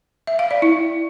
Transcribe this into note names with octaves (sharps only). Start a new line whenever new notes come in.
E5
F5
D5
E4